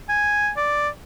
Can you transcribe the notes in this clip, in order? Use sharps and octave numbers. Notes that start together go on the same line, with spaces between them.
G#5
D5